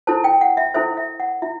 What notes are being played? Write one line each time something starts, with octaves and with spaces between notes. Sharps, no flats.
E4 A4 C5 A5
G5
F#5
E5
E4 A4 C5 E5
E5
F#5
E4 E5